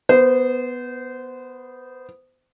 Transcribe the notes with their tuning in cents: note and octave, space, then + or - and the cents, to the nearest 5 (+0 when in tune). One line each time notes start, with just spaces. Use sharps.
B3 +0 C5 -25